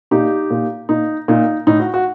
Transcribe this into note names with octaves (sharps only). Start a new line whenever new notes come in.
A#2 D#4 G4
A#2
A#2 D#4
A#2 D#4
A2 D#4
F#4
F#4